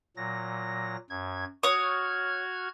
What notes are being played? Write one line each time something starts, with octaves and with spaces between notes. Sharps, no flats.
A#2 F#3 A#6
F#2 G#6
F#4 C#5 D#6 F6 G#6